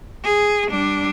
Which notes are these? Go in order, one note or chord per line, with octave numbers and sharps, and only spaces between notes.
G#4
G3 D4